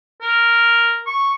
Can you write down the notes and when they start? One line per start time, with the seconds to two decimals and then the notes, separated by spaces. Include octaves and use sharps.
0.22 A#4
1.07 C#6